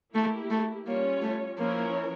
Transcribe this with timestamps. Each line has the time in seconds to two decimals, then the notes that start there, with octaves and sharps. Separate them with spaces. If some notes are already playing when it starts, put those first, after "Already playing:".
0.14 A3 A#3 E4 G4
0.51 A3
0.86 G3 A#3 C#4 F4 C#5
1.22 A3
1.58 F3 A#3 C#4 E4 A#4 C#5